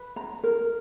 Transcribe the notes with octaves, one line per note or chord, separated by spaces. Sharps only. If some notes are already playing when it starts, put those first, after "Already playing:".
Already playing: B4
A#5
A#4